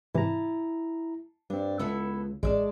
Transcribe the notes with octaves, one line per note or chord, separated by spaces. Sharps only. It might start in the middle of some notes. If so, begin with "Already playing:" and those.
G#2 C3 E3 E4 A5 A#5
G2 C4 D4
C#2 B3 E4 A4
A1 G#3 D5 E5 A5